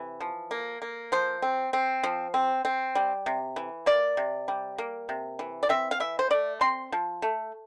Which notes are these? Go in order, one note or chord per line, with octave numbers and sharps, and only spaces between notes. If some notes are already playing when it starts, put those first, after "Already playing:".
Already playing: C3 E3
F3
A#3
A#3
F3 C5
C4
C4
F3
C4
C4
G3
C3
E3
A#3 D5
C3
G3
A#3
C3
E3
D5
C4 E5
F5
E3 E5
C5
A3 D5
C4 C6
F3
A3